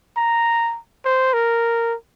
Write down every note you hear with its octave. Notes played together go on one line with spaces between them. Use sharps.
A#5
C5
A#4